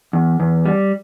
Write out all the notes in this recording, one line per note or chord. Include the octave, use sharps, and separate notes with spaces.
E2
E2
G3